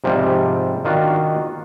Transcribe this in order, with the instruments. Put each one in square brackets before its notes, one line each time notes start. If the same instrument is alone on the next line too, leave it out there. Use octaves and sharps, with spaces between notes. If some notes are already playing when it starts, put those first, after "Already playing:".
[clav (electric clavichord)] G#2 C3 F3 G3
D#3 D4 F4 F#4